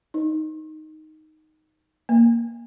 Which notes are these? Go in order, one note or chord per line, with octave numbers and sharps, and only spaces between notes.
D#4
A#3